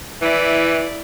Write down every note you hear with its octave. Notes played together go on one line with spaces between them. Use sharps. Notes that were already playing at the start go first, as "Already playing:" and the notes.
E3 E4 D5